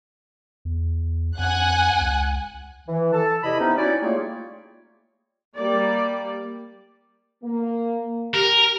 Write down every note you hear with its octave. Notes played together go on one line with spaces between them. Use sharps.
E2
F2 F#5 G#5 F#6
C#2
E3
A4 A5
E2 C3 E4 D#5 B5
C3 B3 C#4 D#4
C#4 D#4 E4 F#4 C#5 D5
G3 A3 A#3 F4 G#4 C#5
G3 A#3 D5
A#3
G4 A#4